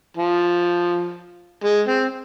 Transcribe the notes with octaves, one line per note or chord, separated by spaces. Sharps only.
F3
G#3
C4